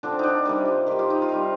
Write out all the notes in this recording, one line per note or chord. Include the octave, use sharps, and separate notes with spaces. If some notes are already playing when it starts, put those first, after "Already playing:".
D3 F3 C4 D4
D4 D#4
C3 G3 A#3 D#4
F4
D#3 A#3 G4
F4
D#4
F4
C3 D#3 G3